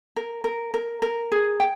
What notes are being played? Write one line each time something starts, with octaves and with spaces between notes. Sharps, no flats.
A#4
A#4
A#4
A#4
G#4
G5